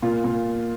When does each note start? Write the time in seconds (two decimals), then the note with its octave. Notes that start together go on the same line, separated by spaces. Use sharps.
0.02 A#2 F4
0.24 A#2